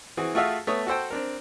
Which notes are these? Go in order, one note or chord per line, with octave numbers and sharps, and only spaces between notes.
E3 C4 F#4 G#4
A3 F4 F#4 G#4 E5 F5
A3 B3 C#5 D#6
F#4 A4 C5 G5
C4 D4 A#4